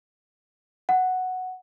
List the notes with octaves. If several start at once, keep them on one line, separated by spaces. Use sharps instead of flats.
F#5